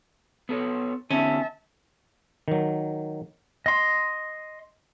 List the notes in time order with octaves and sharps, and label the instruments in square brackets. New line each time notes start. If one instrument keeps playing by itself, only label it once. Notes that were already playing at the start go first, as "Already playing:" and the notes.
[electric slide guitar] B3 A4 C#5
[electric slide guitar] D3 B3 D#4 [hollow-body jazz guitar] C#4 [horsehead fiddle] E5 A5
[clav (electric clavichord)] D#3 F#3
[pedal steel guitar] D#5 C6